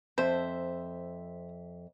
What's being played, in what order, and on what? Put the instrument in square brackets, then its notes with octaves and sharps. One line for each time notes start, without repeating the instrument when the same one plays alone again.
[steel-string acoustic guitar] F2 E5 [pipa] C5